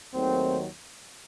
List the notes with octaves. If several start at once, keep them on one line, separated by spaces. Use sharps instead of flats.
D#2 D#3 F#3 A3 C4